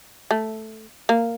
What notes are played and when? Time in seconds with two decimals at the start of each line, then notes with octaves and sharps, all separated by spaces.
0.31 A3
1.09 A#3